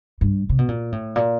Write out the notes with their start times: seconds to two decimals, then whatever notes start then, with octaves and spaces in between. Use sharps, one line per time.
0.21 G2
0.49 C3
0.58 B2
0.68 A#2
0.92 A2
1.16 A#2